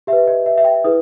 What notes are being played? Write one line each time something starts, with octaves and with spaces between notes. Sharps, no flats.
G4 E5
B4
D#5
E5
E5
G5
E4 G#4 B4 D#6